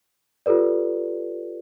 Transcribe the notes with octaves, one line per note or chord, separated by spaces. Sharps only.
F4 G4 A4 B4 D5